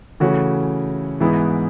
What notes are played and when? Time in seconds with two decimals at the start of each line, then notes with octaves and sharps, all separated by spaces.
0.20 C#3 E3 A3 C#4 F#4
1.20 G#2 E3 B3 E4 G#4